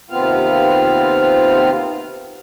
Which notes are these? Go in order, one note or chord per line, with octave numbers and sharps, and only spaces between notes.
D#2 C3 B3 C4 F4 F5